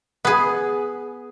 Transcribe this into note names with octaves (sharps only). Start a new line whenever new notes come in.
B3 G#4